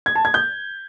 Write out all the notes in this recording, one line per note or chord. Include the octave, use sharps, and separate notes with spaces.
G#6
A5
G#6
G6